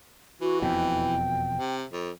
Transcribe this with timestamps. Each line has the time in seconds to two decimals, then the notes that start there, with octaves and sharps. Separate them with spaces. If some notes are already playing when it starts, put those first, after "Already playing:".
0.41 E3 F#4
0.62 E1 F2 B2 G5
1.57 C3
1.92 F2